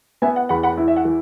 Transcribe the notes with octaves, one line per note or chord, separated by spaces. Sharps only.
B3 E5 G#5
F#5
E2 F#5 B5
F#5 B5
E4
E5
F#5
E3